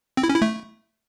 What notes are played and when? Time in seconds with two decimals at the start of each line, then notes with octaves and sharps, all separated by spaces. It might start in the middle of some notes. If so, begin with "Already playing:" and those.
0.17 C4
0.23 E4
0.30 C#4
0.36 E4
0.42 A3